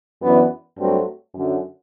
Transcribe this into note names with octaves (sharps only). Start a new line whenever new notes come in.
F#2 E3 B3 D4
G2 F#3 A3 C4 F#4
F#2 D3 F#3